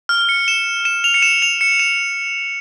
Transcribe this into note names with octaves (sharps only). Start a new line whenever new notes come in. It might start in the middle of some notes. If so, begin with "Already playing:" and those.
F6
C#7
E7
E7
F7
C#7
E7
F7
C#7
E7